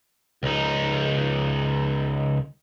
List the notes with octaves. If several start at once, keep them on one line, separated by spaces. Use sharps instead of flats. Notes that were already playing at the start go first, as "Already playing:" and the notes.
C#2 D#4